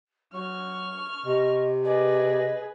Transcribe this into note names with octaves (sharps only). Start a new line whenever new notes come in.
F#3 C#6 F6
C3 D#5
G#4 B4 D5 D#5